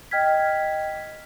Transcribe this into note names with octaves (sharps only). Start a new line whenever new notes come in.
D#5 G5 F6 G#6 B6